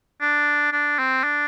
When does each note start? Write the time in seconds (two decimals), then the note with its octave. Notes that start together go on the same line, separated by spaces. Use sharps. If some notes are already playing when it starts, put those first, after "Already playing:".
0.21 D4
0.72 D4
0.99 C4
1.24 D4